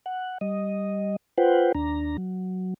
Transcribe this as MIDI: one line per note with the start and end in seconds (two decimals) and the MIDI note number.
0.06 0.38 78
0.41 1.16 55
0.41 1.16 75
1.38 1.72 65
1.38 1.72 71
1.38 1.72 72
1.38 1.72 78
1.38 1.72 79
1.75 2.17 39
1.75 2.17 62
1.75 2.17 82
2.18 2.74 54